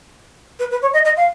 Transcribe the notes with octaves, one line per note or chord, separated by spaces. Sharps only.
B4
B4
C#5
D#5
D#5
F5